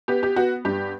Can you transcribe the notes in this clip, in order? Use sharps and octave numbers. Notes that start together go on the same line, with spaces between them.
B3 G4
G4
B3 F#4
G2 G4